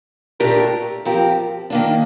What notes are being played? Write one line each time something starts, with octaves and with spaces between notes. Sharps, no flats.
A#2 A3 D4 G4 A#4
F3 C4 G4 A#4
D#3 A#3 D4